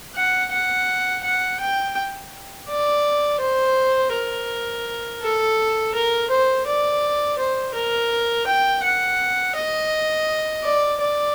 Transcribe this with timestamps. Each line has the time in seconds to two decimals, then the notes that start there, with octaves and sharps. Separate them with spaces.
0.16 F#5
0.51 F#5
1.23 F#5
1.60 G5
2.69 D5
3.40 C5
4.12 A#4
5.21 A4
5.94 A#4
6.30 C5
6.67 D5
7.38 C5
7.74 A#4
8.46 G5
8.83 F#5
9.55 D#5
10.64 D5
11.00 D5